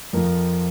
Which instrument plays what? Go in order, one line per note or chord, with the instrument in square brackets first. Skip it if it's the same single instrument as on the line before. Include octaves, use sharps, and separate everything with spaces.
[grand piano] F2 F3 A#4